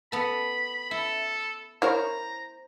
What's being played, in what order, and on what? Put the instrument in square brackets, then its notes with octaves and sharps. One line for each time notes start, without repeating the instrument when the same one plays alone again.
[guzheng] B3 A4 [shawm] B5
[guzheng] E4 [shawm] A4
[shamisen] E4 A#4 C#5 [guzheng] C5 [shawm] A#5